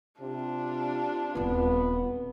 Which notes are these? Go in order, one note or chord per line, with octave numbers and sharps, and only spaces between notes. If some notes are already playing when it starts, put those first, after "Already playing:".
C3 D4 F4
D#1 B3 C4